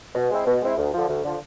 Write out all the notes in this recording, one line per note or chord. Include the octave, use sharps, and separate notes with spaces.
B2
G#3 C4 E4
B2
G#3 C4 E4
D2
D3 F3
D2
D3 F3